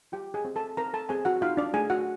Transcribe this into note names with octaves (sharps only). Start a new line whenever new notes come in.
F4 G4 G5
G#4 G#5
C4
A4 A5
C4 A#4 A#5
A4 A5
C4 G#4 G#5
F#4 F#5
D#4 F4 F5
D4 D5
A3 G#4 G#5
F#4 F#5